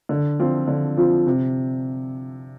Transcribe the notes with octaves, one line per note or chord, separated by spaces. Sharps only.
D3
F3 C4 F4
D3
F3 C4 F4
C3